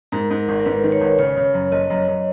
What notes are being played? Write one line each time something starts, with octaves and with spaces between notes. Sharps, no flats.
G#2 A#4
G#2
A#4
G#1
A#4
G#2 B4
D#3
C#5
G#1
C#3 C#5
C#3
F#2
F#1 D#5
F#2
F#2